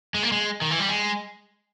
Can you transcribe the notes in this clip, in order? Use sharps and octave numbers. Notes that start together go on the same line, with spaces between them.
G#3
A#3
G#3
D#3
E3
G3
G#3